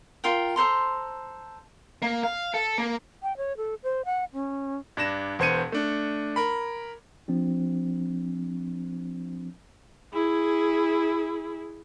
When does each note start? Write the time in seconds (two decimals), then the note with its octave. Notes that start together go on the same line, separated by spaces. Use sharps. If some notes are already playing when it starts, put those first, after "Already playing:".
0.24 F4 A#4 G5
0.56 A4 C5 A#5 C6
2.02 A#3
2.24 F5
2.54 A4
2.78 A#3
3.23 G5
3.37 C#5
3.57 A4
3.83 C5
4.05 F#5
4.33 C#4
4.97 G2 D4 A#6 E7
5.39 E1 B3 C5 G#6 C#7 D#7
5.72 A3 D4
6.36 A#4 B5
7.28 F3 C4 D4
10.13 E4 G#4